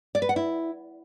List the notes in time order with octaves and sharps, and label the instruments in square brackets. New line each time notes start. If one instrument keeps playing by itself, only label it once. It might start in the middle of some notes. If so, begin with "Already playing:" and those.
[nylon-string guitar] D5
B4
F#5
E4